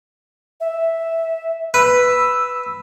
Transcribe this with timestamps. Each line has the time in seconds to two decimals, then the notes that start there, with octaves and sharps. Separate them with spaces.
0.60 E5
1.74 B4 E6